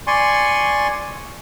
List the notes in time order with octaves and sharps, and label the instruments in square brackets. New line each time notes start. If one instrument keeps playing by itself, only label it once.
[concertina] D5 G#5 C6 C#6